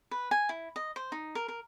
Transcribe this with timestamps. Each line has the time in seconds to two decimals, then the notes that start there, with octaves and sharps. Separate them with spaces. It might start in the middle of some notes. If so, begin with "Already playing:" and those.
0.11 B4
0.31 G#5
0.49 E4
0.76 D#5
0.96 C5
1.12 D#4
1.35 A#4
1.48 A#4